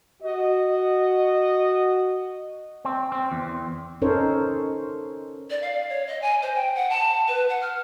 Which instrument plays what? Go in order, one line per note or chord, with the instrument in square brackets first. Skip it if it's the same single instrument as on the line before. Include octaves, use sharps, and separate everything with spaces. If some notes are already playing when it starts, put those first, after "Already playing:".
[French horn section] F#4 D#5
[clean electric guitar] C4
C4
E2
[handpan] C#4 D#4 A4 A#4 C5 C#5
[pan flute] D5
F5
C#5
D#5
G#5
C5
G5
F#5
A5
B4
F#5
F6